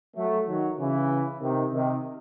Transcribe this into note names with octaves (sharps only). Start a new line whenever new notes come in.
F#3 A3
D#3 F#3
C#3 E3
C3 D#3
C3 D#3